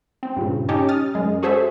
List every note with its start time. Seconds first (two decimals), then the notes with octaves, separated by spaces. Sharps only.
0.23 C4
0.37 G2 A#2 C#3
0.69 C#4 D#4 G4 C#5 A5
0.89 D#6 F6 A6
1.14 F#2 G#3
1.43 F#4 G#4 A4 C5 C#5 E5